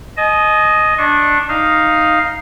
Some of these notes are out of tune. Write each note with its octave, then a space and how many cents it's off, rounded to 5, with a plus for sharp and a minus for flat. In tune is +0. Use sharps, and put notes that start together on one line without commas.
D#5 +0 G#5 +45
D4 +0 C#6 -35
D#4 +0 F5 +0